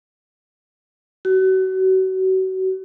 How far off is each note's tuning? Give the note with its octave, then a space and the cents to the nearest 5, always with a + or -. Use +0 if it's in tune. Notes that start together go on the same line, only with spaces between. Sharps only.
F#4 +35